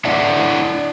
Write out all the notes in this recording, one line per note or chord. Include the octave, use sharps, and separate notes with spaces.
D4 E4 D5 E5 F#5